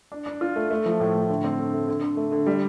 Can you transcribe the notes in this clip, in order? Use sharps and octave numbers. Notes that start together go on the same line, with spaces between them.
D4
D4
F4
A3
A3
F3
A2
A2
D3
C4
D3
A3
D3
D3
A3
D3
G3